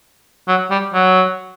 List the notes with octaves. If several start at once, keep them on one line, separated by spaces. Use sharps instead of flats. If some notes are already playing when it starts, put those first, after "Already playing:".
F#3
G3
F#3